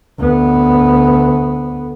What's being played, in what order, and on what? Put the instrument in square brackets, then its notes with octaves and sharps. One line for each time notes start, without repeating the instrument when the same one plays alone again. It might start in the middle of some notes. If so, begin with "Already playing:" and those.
[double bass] D2 B3